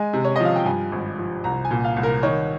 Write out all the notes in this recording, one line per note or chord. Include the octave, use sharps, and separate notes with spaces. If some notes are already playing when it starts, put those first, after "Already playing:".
Already playing: G#3 G#5
C3
C#5
F3 D#5
F5
G5
G2 G#5
G#1
F3
C2 A#5
G#5
A#2
F5
C2
A#4
D#3 C#5